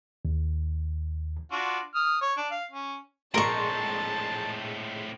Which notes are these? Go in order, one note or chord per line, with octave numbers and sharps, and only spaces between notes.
D#2
D4 F4 F#4
D#6 F6
C#5
D4
F5
C#4
A#1 A2 G#3 C4 A#4 A5 C6 C#6